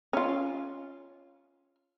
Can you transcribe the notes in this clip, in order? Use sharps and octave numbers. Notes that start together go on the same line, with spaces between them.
C#4 F4